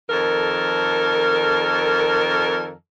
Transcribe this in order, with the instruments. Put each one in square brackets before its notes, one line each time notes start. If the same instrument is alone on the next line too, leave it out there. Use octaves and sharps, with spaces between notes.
[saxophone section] F2 D#3 A4 A#4